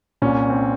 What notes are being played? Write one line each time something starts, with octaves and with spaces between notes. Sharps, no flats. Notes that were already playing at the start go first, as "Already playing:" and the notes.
C2 A#2 C#4
C4